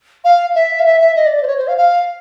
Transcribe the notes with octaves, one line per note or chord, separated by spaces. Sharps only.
F5
E5
F5
E5
E5
D#5
D5
D5
C5
C#5
C5
F5
F5